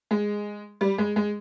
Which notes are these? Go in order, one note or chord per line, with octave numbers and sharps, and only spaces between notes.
G#3
G3
G#3
G#3